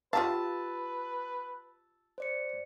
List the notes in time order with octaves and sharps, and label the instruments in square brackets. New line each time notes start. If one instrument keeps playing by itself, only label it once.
[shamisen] F4 G4 F5 [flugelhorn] B4 [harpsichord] A5 [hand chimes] E6
[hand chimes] C5 D5 C#7